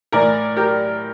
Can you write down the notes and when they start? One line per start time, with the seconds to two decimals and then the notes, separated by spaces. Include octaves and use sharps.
0.12 A2 E3 A#4 D5
0.56 G4 A#4